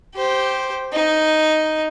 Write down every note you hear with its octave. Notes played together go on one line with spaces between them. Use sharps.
G4 C5
D#4